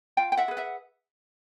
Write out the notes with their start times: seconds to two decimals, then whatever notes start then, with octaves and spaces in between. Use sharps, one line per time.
0.17 F4 F5 G5
0.32 G5
0.37 E5 F#5
0.48 G#4 B4
0.57 E5 F#5